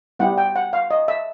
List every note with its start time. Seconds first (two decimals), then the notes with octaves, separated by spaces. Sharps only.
0.19 G3 B3 E4 G4 F#5
0.38 G5
0.56 F#5
0.73 F5
0.91 D#5
1.08 E5